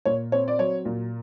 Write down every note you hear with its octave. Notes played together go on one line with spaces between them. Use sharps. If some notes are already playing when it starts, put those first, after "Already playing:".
A#2 C#5
C4 C#5
D5
F#3 C#5
A#2